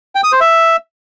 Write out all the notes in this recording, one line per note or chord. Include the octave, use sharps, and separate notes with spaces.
G5
D#6
C5
E5